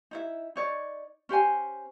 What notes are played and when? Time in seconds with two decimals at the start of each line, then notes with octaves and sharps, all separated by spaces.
0.11 D#4 E4 E5
0.56 D#4 C#5 D5
1.29 C#4 G4 C5 G#5